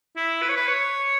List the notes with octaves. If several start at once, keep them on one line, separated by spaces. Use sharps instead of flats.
E4
B4
C#5
B4
C#5